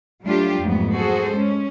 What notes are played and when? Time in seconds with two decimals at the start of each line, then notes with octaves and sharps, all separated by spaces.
0.24 F#3 G3 A3 D4 F4 G4
0.61 F2 G#2 F#3 A3 B3
0.94 F#4 G#4 A4 C5
1.31 G#3 C#4